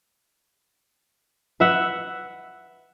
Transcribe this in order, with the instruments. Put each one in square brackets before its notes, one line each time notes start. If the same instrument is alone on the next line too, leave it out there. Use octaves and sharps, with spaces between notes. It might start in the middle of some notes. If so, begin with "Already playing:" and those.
[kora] B4 E5 F#5